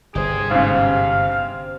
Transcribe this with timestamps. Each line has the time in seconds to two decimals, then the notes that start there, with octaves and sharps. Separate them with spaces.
0.15 G1 G4 G#4 C5
0.51 G#2 C#3 F5